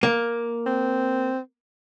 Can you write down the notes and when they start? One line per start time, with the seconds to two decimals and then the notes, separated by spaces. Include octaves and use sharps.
0.03 A#3
0.67 C4